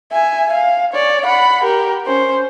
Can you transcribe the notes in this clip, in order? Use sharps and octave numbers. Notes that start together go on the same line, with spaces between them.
E5 G#5
F5
C#5 D5
F#5 B5
G4 A#4
C#4 C5